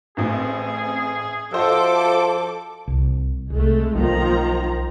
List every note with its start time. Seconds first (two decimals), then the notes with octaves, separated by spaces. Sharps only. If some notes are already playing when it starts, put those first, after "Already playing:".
0.17 A1 A2 C4 G#4
1.52 F3 F#4 A4 C5 D#5 E5 D6
2.88 C2
3.50 C2 G#3 A3
3.95 B1 D#3 F3 G3 A#3 A#5